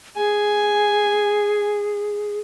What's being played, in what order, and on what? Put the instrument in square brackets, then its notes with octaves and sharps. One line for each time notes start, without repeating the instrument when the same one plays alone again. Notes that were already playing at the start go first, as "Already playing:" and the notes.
[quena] G#4 [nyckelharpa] G#5